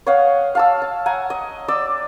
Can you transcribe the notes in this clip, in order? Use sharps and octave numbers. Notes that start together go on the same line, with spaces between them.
C#5 D#5 F5 F#5
F5 A5 E6
A5
F#5 G#5 A#5
D#5
D5 D6 E6